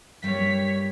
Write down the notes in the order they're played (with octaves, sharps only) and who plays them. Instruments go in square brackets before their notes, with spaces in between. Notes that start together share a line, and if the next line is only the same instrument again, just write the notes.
[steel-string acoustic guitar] G2 G3 A#3 [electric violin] C#5 B6